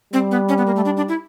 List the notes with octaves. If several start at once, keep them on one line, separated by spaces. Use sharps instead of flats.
G3 C4
B3
C#4
B3
A#3
A3
D4
D4
E4